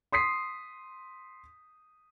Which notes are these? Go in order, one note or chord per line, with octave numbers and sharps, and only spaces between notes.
C6 D#6 B6 C7